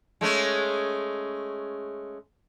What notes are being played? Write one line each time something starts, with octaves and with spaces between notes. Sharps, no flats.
G#3 A3 C#4